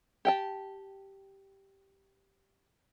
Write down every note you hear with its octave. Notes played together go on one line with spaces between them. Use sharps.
G4 G5 A5